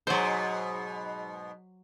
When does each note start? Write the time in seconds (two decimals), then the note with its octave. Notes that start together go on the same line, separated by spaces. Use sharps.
0.07 G#2 B2 F#3 C5